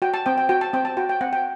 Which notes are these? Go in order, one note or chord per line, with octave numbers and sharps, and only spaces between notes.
F#4 G5
A5
C4 G5
G5
F#4 G5
A5
C4 G5
A5
F#4 G5
G5
C4 F#5
G5